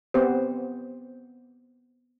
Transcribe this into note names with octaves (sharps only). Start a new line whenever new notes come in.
B3 C4 G4 C5